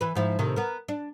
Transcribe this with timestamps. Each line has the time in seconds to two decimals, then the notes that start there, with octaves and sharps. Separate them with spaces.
0.01 E3 B4
0.15 G#2 F3 E4
0.39 A2 C3 D#3
0.56 B3 A#4
0.88 D4